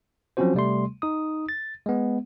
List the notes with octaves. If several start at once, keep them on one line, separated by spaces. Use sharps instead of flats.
F3 F#3 C4 C#4 F#4 C5
C3 G3 A3 C6
D#4 D#6
A6
G#3 B3